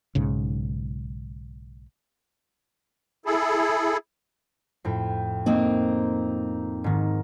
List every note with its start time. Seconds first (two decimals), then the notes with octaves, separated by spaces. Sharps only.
0.15 B1 G#2 C#3
3.26 E4 G#4 A4
4.84 F2 A2 G5
5.46 A#3 C4 D#4
6.84 G#2 D#3